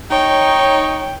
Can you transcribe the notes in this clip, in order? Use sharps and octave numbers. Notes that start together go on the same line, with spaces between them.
D#4 C#5 G5